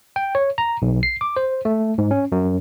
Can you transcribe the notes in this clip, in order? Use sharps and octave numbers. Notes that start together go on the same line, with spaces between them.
G5
C#5
A#5
B1
C7
D6
C5
A3
G#2
C#4
F#2